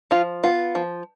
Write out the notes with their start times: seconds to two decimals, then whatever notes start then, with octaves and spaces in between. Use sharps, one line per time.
0.11 F3 F4
0.43 B3 F4
0.75 F3